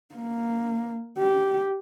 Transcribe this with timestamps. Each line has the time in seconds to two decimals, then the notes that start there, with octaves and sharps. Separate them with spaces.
0.15 A#3
1.18 G4